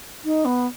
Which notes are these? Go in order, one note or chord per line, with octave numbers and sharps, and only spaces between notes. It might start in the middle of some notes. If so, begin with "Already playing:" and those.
D#4
B3